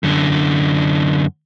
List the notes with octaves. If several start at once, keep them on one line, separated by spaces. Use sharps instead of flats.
F#2 D3